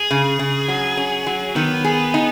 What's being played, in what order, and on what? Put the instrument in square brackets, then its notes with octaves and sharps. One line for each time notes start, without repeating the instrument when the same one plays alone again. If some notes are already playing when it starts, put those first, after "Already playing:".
Already playing: [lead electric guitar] G#4
[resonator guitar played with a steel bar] C#3
C#3
F#3
C#4
F#3
[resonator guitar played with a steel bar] D#3 [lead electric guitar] B3
[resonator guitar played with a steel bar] G#4
D#4